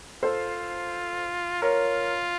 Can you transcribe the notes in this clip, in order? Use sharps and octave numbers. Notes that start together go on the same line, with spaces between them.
F4 A4 C5
F4 A#4 C#5